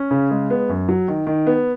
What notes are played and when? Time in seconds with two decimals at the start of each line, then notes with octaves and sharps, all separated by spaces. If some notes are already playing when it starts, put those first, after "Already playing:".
Already playing: C#4
0.11 C#3
0.31 G#3
0.50 B3
0.69 F#2
0.88 F#3
1.08 D#3
1.27 D#3
1.47 B3